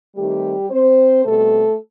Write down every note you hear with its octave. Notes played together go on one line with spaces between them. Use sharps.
D#3 G3 A3 C4 D#4 G4
C4 C5
B2 G3 A3 C4 A4